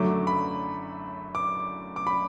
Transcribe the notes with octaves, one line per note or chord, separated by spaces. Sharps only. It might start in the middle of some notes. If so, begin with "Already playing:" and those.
Already playing: F#2 D3 F#3 A3 D6
B5
D6
D6
B5